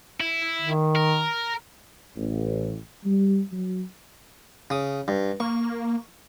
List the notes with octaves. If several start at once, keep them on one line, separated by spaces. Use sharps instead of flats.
E4
D#3
A#4
A1
G3
F#3
C#3 D#6
G2
A#3 C#6